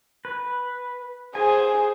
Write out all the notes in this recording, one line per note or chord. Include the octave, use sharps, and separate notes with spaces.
B4
G#4 C5 G#5